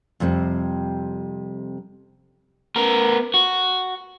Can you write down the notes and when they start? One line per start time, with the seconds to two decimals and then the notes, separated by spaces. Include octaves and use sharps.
0.20 F2 C3 G3 C4
2.76 B3 A#4
3.34 F#4